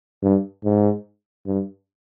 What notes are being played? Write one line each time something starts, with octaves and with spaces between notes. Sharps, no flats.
G2
G#2
G2